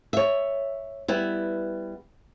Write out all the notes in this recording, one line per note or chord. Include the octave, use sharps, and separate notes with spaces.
C#5 E5
G3 B3 E4